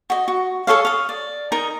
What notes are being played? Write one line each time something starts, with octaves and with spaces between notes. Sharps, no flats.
F#4 D#5
F#4
G#4 A4 C#5 F5
F5 D#6
D5
D#4 A#4 D#5 A#5